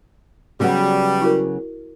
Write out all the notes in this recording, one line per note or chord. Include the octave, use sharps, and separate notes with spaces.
C#3 F#3 G3 B3 F#4 F#5
E4 F#4 A#4